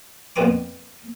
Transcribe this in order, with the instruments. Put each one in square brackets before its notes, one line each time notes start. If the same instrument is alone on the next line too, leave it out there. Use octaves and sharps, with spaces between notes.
[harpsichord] F2 A#2 B3 C4 G#5 D6